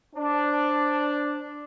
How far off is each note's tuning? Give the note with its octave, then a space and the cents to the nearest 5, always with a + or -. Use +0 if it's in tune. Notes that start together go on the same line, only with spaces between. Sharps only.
D4 +0 C5 +0